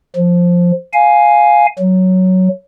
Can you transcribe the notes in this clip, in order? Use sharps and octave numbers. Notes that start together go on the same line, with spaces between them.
F3
F5 G#5
F#3